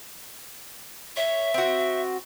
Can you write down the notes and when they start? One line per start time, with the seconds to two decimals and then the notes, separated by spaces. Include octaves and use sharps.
1.16 C#5 E5
1.54 C4 F#4